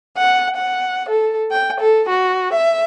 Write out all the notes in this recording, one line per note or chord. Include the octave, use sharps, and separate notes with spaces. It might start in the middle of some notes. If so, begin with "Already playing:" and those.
F#5
F#5
A4
G5
A4
F#4
E5